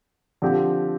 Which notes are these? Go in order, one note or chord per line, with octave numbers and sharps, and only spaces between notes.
D3 F3 C4 G4